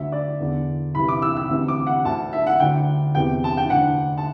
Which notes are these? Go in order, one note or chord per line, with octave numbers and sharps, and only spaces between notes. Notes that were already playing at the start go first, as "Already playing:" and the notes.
Already playing: D2 D3 E5
D5
E2 D3
C2 C3 E3 B5
D6
E6
E6
D2 C3 E3
D6
F#5
D2 D3 A5
E5
F#5
D2 D3 G5
E2 C3 E3 G5
A5
G5
D2 D3 F#5
A5